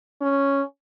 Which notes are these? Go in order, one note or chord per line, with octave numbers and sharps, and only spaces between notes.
C#4